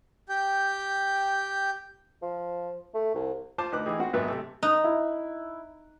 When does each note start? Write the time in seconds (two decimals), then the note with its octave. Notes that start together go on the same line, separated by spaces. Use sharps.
0.29 G4 G5
2.22 F3
2.94 A3
3.14 C2
3.58 F4 C5 A5 C6 D6
3.72 D2 D#4 B4 D6 F#6
3.86 E3 D#4 G4 G#4
3.99 C4 F#4 F#5
4.13 G#1 G#2 F#3 B3 B4 E5
4.28 C3 A3
4.63 D#4 F#6
4.84 E4